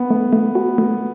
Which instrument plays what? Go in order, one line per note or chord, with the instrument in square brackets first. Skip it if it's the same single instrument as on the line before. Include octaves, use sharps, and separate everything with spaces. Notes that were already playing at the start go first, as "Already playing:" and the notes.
Already playing: [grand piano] B3
[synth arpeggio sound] A3
A3
F#4
A3